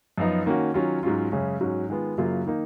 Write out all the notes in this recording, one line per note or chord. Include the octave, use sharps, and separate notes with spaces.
F#2 F3 B3 D#4
D#3 A#3 C#4 F#4
D#3 F#3 C#4 F4
G#2 F#3 C#4 F4
F#2 C#3 G#3 C#4
G#2 F#3 C#4 F#4
D#3 G#3 B3 F4
F#2 C#3 F#3 A#3 F4
D#3 A#3 D#4